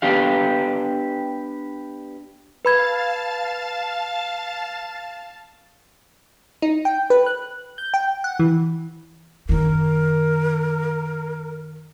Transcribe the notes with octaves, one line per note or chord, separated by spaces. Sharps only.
B3 D4 G4 F5
B4 F5 A5 B5 G#6 A6
D#4
G5
B4
F#6
G6
G5
F#5
E3
F#2 D#3 A#4